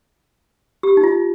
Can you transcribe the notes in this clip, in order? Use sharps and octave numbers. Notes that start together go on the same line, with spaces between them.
G4
D#4
F4